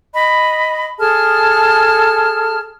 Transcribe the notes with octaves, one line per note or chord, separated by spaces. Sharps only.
D#5 B5
G#4 A4 A5 F6